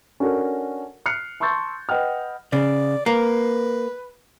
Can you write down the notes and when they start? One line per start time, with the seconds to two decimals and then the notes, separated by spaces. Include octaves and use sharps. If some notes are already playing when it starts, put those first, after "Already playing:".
0.20 C#4 D4 F#4 A4 A#4
1.06 F6 F#6 C7 C#7
1.40 A5 C6 C#6 E6 G6 A6
1.89 B4 D#5 F#5 G5 F6
2.53 C#3 D5
3.06 A#3 B4